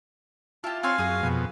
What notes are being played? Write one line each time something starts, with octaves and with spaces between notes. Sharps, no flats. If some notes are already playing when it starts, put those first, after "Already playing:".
E4 F4 G4 A5
C4 C#5 F5 G#5 C6
F#2 F#4 G#4
F2 B2